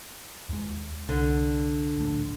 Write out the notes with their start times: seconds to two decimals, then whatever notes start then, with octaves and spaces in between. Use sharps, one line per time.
0.49 D#2 G#3
1.09 C2 D3
1.98 D1 A#1 A3